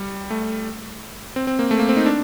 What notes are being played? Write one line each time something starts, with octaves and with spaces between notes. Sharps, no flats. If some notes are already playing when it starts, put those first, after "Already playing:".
Already playing: G3
A3
C4
C4
A#3
A3
A#3
C4
D#4
D4